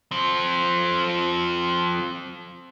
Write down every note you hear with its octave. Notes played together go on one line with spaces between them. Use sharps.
F3 C4